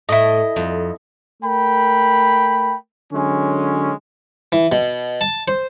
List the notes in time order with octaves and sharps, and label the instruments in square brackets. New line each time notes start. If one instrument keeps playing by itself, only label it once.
[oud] A2 [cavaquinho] E4 D#5
[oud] F2
[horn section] A3 A#4 G5 B5
D3 F#3 G#3 C#4
[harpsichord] E3
B2
A5
C5